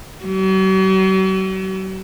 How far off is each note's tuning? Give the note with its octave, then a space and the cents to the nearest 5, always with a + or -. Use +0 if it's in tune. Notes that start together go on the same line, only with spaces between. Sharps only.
F#3 +45